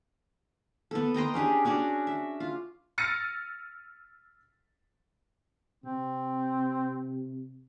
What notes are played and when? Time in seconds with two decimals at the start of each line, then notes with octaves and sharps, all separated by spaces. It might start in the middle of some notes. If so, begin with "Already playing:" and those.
0.91 B3 A4
1.14 D#5 G5 A#5 C6
1.34 C#4 D4 G4 G#4
1.65 C#4 D4 F#4 D5
2.07 E5
2.40 F4
2.98 E6 F6 A6 A#6 C#7 D#7
5.84 C3 C4